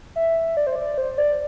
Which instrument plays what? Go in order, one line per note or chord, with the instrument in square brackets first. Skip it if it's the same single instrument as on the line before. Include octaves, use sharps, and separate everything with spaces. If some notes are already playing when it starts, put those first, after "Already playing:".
[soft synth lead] E5
D5
C5
D5
C5
D5